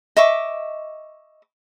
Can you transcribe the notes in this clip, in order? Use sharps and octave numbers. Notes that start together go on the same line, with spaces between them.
D#5 E5 C#6 D6